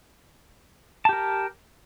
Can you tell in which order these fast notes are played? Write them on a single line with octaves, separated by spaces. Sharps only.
A5 G4 A#4